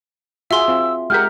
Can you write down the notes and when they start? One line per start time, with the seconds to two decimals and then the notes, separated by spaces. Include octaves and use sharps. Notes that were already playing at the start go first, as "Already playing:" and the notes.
0.51 F4 F#4 G#4 E5 C6 E6
0.68 C4 F4
1.10 G#3 G4 A#4 F#5 F6 G6 B6